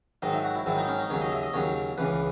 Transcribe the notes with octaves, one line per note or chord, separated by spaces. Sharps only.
G#2 D#3 F#3 D#5
E5
F#4
E4
G#2 D#3 F#3 E4
D#4
C#4
D#4
D#2 C#3 F#3 C#5
D#5
E5
D#5
D#2 C#3 F#3 C#5
C#2 C#3 E3 B4